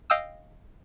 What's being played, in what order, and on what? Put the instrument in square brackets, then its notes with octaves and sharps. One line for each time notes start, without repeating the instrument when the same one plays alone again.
[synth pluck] D#5 F5 G5 D#6 E6